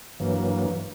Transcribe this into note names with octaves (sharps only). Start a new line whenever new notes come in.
G2 E3 F#3 A#3